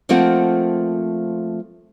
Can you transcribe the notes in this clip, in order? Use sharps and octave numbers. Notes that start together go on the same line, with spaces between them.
F3 A3 A#3 C4 F4 F#5